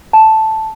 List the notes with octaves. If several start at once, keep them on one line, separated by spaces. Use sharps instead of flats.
A5